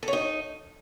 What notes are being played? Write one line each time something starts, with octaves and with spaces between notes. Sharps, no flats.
A4
C#5
D#4